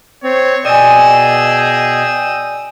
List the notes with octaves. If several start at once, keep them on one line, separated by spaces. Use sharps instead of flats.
C4 C#5
B2 G#4 D5 D#5 G5 G#5 D#6 E6